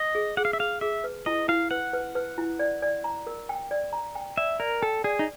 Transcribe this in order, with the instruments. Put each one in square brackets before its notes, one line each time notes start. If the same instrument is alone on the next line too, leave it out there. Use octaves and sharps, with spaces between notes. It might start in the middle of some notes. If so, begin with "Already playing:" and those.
Already playing: [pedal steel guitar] D#5
[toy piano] G#4
[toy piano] G#4 [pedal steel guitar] F#5
[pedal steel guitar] F5
E5
[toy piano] G#4 [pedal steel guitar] F5
[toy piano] G#4 [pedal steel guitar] E5
[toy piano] B4
[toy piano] E4 [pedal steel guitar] D#5
[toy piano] E4 [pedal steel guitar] F5
[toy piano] B4 [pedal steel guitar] F#5
[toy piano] B4
B4
E4
D5
D5
A#5
A#4
G5
D5
A#5
G5
[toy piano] D5 [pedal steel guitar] E5
[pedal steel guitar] A#4 [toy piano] D5
[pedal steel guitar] A4 [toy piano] G5
[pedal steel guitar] G#4 [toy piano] D5
[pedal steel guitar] D#4